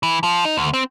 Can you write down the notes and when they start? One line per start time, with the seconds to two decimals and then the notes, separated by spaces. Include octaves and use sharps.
0.03 E3
0.24 F3
0.45 D#4
0.57 D2
0.74 C4